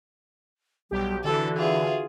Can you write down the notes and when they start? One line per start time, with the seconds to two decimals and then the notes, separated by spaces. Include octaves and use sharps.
0.91 B1 G3 G4
1.24 D3 E3 F#4 A4
1.57 F4 G#4 B4 E5 F#5